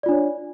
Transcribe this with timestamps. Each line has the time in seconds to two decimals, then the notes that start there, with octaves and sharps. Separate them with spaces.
0.03 D5
0.06 F4
0.09 D4
0.11 C#5